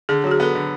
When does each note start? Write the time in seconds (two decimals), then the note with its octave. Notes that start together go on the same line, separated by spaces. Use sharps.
0.09 D3 G#4
0.24 F#3 F#4
0.31 G#4
0.40 B3 A4
0.55 D3